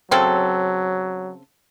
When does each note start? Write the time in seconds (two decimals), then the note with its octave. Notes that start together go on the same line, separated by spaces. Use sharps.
0.11 C#3 F#3 C4 A4